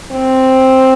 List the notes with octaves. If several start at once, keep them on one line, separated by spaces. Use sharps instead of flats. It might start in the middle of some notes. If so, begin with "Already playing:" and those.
C4